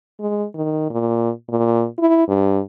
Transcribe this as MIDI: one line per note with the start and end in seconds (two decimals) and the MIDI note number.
0.20 0.45 56
0.55 0.89 51
0.90 1.30 46
1.49 1.85 46
1.99 2.25 64
2.28 2.60 43